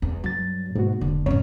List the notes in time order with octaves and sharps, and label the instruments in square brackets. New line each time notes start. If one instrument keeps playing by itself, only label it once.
[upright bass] E2
[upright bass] G2 [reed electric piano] F#3 A6
[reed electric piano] G#2 B2 F#4 [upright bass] A#3
[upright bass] E1 [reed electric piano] D3
[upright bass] F2 G#2 [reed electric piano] C#4 C#5